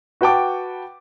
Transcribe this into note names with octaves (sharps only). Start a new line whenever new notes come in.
F#4 B4 F#5 G5 A5 D6